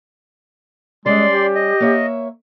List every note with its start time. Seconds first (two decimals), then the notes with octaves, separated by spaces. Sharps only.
1.06 G3 G#3 C#4 D5 C6
1.30 G4
1.55 D#5
1.80 A#3 C#5 E5